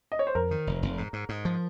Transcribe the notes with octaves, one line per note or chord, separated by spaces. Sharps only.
D#5
C#5
C5
F2 A#4
D#3
F1
F1
G#2
G#2
G#2
F3